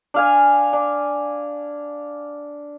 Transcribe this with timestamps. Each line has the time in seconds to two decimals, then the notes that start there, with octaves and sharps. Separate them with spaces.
0.14 D4 F5 G#5
0.73 D4